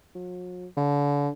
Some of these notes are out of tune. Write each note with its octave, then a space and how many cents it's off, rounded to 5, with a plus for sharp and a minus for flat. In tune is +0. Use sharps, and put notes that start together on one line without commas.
F#3 -45
D3 -35